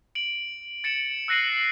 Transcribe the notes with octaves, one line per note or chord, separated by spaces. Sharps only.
D7 F#7
A6 C#7 D7 E7 F#7
E6 F#6 A#6 C7 D#7 F#7